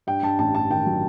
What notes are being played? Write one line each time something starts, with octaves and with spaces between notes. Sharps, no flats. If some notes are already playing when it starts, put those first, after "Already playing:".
G2 G5
G2 A5
A1 A5
G2 A5
D#3 G5
F#3